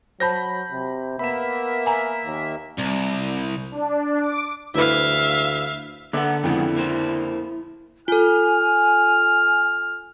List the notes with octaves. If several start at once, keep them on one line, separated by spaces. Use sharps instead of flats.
F#3 C5 A5 B5 G6 A#6
C3
A#3 B3 E5 B5 E7
G#5 A#5
D#2
C2
D4
D6
D2 E4 B4 E5 F5
D3 A#3 A4 B4 E5 F#5 D6
F2 G#2 C#3 F3 B3 E4 G5
A#3 C5
F4 A4 G#5 F6